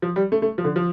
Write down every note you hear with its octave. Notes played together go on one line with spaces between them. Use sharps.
F3
G3
A3
A3
F3
D3
F3